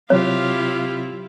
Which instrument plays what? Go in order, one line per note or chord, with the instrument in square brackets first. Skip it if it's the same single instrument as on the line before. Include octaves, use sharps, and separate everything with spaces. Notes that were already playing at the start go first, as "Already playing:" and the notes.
[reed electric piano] C3 F#3 C4 [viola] E4 F4 [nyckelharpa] G4 F5 [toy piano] C#5